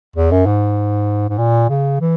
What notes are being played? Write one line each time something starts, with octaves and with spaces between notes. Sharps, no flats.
E2
F#2
G#2
G#2
A#2
C#3
E3